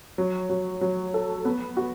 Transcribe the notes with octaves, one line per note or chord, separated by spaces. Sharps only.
F#3
F#3
F#3
A4
B3
F#4